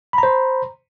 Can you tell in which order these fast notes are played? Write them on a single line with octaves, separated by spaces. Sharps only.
B5 A#5 C5